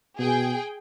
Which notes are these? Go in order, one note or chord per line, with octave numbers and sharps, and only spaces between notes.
B2 G#4 G5